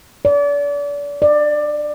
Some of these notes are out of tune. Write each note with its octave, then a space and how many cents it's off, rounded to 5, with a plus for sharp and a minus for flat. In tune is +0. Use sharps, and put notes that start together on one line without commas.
D5 -35
D5 +20